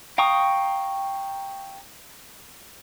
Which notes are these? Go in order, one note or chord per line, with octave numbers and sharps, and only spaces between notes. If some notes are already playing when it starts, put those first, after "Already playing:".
F5 G5 A#5 C#6 D#6